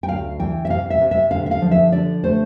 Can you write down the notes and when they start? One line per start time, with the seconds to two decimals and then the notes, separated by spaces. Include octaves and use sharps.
0.03 G5
0.09 D2 F5
0.39 E3 G5
0.65 E5
0.70 C3 F5
0.90 E5
1.01 C3
1.11 E5
1.31 D3 F5
1.46 E5
1.51 F5
1.62 F3
1.71 E5
1.92 D3 D5
2.23 A3 C5